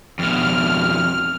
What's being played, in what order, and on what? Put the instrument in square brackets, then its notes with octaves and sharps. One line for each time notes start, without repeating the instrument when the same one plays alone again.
[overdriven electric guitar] F2 B2 [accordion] F6